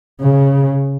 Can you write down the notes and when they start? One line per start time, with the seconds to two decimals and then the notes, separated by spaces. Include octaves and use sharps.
0.21 C#3